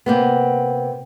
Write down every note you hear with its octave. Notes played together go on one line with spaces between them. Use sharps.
C3 A#3 B3